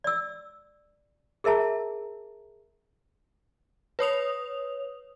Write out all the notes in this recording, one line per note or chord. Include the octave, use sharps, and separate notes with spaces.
D5 E6
G#4 A#4 E5 A5 A#5
B4 C#5 D#6 F7